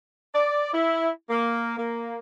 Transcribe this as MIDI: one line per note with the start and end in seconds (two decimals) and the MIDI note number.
0.34 0.71 74
0.73 1.09 64
1.30 1.76 58
1.77 2.19 58